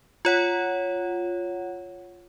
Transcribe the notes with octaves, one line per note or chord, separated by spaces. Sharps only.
F4 C#5 F#5